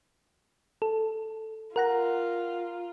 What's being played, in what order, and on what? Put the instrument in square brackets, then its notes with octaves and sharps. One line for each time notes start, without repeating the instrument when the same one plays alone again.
[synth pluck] A4
[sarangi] F4 [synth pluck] A#4 F#5 A#5